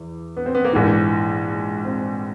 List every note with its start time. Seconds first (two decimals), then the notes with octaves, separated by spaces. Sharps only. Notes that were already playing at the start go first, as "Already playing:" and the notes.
Already playing: E2
0.37 B3
0.46 C4
0.55 B3
0.65 A#3
0.73 A#1 G#2 E3 B3
1.85 C4